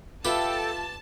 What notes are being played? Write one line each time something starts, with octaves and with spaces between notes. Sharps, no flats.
F4 G4 A4 B4 E5 G5 A5